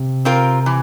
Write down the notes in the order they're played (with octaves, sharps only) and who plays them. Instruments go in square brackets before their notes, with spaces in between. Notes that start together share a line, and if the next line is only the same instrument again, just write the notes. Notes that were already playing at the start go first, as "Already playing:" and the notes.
Already playing: [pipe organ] C3
[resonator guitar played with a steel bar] C4 F4 A#4
E3